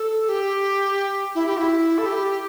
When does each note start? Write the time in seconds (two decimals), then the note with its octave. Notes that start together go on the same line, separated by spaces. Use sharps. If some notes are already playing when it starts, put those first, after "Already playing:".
Already playing: A4
0.29 G4
1.35 E4
1.47 G4
1.59 E4
1.98 A4
2.06 G4